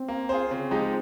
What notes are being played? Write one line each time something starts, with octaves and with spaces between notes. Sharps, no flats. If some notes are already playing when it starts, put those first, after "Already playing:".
Already playing: C4
A#3
F4 G#4 C5
C#3 C4
F3 G#3 D#4 G4